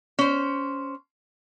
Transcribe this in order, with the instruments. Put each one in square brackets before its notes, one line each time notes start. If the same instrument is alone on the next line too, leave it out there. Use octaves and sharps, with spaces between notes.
[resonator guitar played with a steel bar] C#4 C5